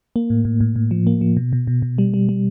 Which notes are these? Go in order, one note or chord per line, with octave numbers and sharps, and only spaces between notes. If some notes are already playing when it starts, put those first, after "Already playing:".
A#3
A2
A2
A2
A2
F3
A#3
F3
B2
B2
B2
B2
G3
G3
G3